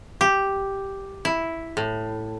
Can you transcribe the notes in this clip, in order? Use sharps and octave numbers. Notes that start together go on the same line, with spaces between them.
G4
E4
A2